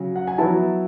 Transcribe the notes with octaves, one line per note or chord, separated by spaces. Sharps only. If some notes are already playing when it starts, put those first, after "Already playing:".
Already playing: C#3 F#3
F#5
G#5
F#3 B3 E4 A5